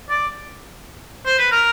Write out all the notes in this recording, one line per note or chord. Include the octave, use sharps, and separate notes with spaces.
D5
C5
B4
A#4